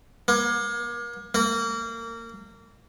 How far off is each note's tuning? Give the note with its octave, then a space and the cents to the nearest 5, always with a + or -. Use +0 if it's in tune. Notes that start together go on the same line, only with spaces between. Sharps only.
A#3 +35
A#3 -25